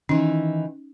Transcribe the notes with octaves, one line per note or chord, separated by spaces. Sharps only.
D#3 E3 C#4 D#4